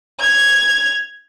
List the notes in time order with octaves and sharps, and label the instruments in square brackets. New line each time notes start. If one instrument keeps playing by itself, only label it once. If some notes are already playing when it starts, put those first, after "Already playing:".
[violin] G#6 F7